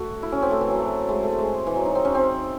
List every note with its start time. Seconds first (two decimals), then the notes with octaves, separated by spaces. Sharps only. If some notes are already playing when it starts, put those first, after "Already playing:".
Already playing: A3 F#4
0.23 E4
0.32 C#4
0.42 C4
0.51 A3
0.61 E3
0.71 F#3
0.80 A3
1.09 G#3
1.23 A3
1.38 G#3
1.67 E3
1.76 F#3
1.86 D#4
1.95 C4
2.05 C#4
2.15 C4